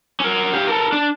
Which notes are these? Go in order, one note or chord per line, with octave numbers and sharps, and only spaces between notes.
C#4 A#4
G4 F5
A4 A#4
D4